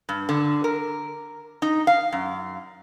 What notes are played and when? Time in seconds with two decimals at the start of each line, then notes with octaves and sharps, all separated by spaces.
0.09 G2
0.29 D3
0.64 A#4
1.62 D#4
1.87 F5
2.12 F#2